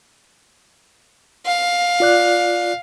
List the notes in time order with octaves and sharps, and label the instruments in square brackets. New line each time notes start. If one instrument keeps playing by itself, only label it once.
[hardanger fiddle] F5
[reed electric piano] F4 D5 F#6